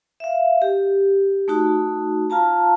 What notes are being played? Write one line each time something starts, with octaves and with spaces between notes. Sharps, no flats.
E5 F5
G4
A3 D#4 F#4
F4 F5 A5 A#5